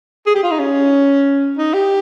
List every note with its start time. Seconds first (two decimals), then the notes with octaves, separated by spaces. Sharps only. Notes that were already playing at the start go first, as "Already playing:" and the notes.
0.26 G#4
0.35 G4
0.43 F4
0.51 D#4
0.59 C#4
1.57 D#4
1.74 G4